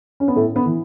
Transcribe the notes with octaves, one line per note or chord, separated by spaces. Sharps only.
C#4
B3
A2 A3
B3
E3